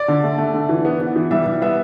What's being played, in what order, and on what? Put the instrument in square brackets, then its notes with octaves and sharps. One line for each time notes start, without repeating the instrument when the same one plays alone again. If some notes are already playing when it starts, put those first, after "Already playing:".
Already playing: [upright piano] D5
D3
A3
A3
D3
E3
B3
B3
E3
G3 E5
G3
B3 E5